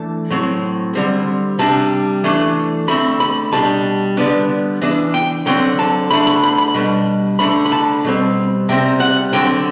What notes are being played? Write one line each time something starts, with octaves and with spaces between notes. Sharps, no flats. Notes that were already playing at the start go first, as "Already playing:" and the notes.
Already playing: E3 A3 D4 A5
A2 F#3 C4
D3 G3 C4
C3 G3 D4 A5
E3 A3 D4
D3 A3 C4 B5
B5
B2 G3 D4 A5
D3 G3 B3 D4
E3 B3 D4
G5
D3 F#3 C4 G5
A5
D3 A3 D4 B5
B5
B5
B5
B2 G3 D4
D3 A3 D4 B5
B5
A5
B2 G3 C4
C3 G3 C4 G5
F#5
D3 F#3 C4 G5